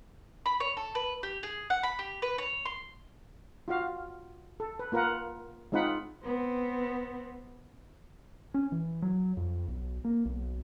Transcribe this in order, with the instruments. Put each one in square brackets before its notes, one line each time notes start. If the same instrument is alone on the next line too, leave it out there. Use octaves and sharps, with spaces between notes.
[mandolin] B5
C#5
A4
B4
G4
G#4
F#5
B5
G4
B4
C#5
C6
[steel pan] F4 F#4 F5
A4
B4
A#3 F4 A#4 B4 F#5
G#3 C4 D#4 F4 F#5 B5
[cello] B3 C4
[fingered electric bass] C#4
E3
F#3
F2
B1
A#3
B1